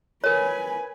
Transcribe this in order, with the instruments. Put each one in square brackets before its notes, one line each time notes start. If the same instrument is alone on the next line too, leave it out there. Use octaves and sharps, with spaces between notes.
[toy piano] A#4 C#5 [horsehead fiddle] B4 G#5